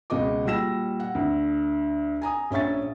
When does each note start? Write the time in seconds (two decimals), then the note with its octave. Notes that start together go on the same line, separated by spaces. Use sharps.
0.10 C#2 B2 F#4 D#5 D6
0.45 A#2 G3 F#4 E6 A#6 E7
1.00 F#5
1.15 D2
2.22 G#5 A#5 D#6
2.51 A#1 C#4 E5 C#6 A6